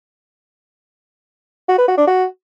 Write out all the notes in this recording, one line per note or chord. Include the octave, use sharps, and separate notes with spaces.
F#4
B4
F#4
D4
F#4